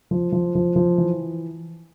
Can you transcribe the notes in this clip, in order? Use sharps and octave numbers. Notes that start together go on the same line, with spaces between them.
F3
F3
F3
F3
E3